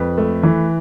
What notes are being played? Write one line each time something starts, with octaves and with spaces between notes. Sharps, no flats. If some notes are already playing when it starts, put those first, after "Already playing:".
Already playing: F2 B4 B5
A3
E3